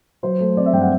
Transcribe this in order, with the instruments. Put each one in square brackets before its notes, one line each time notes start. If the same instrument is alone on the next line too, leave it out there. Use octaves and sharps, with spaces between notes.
[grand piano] F#3 C5
A3
C4 D5
E5
G2 G5
F#5